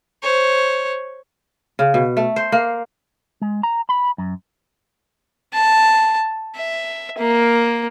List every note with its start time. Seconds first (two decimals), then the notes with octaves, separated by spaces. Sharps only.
0.22 C5 C#5
1.79 C#3
1.94 B2
2.17 A3
2.36 C5
2.52 A#3
3.41 G#3
3.63 A#5
3.89 B5
4.18 F#2
5.54 A5
6.56 E5
7.19 A#3